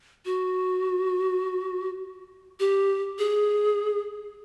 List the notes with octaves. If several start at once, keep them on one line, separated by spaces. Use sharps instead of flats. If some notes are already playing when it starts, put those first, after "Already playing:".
F#4
G4
G#4